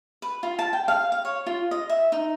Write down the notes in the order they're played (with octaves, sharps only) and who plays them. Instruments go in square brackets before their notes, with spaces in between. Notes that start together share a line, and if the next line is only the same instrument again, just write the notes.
[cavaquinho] B4
F4
A5
G5
F5
F5
C#5
F4
D#5
E5
D#4